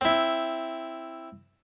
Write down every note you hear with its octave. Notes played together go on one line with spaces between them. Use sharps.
C4 E4